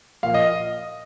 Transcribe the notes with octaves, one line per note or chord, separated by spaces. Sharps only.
A#2 F3 F5
D#5